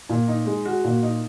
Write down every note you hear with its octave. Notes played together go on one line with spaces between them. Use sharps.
A#2
D#4
G#3
F#4
A#2
D#4